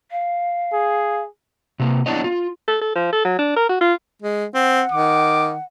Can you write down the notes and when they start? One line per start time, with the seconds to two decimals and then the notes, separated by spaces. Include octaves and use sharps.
0.11 F5
0.73 G#4
1.80 C3 A#3
2.06 B3 D4 E4 C#5 D#5
2.24 F4
2.68 A4
2.81 A4
2.95 F3
3.12 A4
3.25 F#3
3.39 D4
3.56 A#4
3.69 F#4
3.81 F4
4.22 G#3
4.54 C4 F#5
4.92 D#3 D6